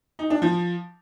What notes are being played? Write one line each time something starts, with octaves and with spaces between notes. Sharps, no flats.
D#4
D4
F3